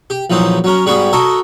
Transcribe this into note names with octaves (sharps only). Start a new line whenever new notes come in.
G4
A#1 E3 F#3 D#4 C5
F#3 C#4 A#4
G#2 G3 G#3 B3 F#4 G#4
F#4 A4 A#4 D#5